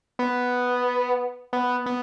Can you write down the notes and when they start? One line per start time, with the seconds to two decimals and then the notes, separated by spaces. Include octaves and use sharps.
0.19 B3
1.53 B3
1.86 B3